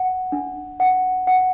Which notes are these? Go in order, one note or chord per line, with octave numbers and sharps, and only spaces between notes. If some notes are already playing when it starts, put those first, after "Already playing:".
Already playing: F#5
D4
F#5
F#5